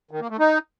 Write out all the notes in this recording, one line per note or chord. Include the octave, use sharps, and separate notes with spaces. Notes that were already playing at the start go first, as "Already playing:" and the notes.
D#3
A#3
A3
D#4